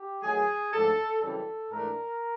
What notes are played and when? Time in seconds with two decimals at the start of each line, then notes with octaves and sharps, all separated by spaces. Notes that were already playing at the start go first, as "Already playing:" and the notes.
Already playing: G4
0.23 D#3 F#3 A3 G#4
0.73 G#2 F3 A3 D4 A4
1.22 F#2 C#3 E3 G3 C4 A4
1.71 G#2 E3 A3 D4 A#4